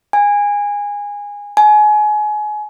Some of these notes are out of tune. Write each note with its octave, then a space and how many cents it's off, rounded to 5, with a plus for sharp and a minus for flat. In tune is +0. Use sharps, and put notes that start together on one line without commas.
G#5 -20
G#5 +30